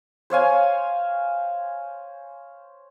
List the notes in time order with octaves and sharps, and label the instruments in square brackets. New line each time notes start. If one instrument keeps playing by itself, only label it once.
[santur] C5 C#5 F5 G#5